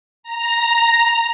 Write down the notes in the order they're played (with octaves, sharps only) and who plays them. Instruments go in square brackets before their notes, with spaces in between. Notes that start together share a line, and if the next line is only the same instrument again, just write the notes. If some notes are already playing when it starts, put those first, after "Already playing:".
[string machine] A#5